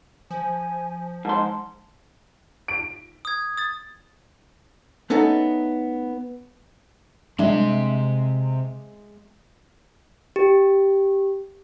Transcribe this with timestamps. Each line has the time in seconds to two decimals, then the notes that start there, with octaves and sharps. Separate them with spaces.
0.30 F3 G#5
1.25 G#2 A5 C6
2.68 D7
3.25 D#6 G#6
3.57 D#6 A6
5.10 A3 B3 C#4 D#4 A4
7.39 C3 G3 G#3 D4 E5 C6
10.36 G4